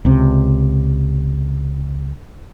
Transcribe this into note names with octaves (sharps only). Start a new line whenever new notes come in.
C#2 C3